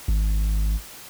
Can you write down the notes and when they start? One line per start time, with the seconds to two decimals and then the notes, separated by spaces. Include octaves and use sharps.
0.08 G#1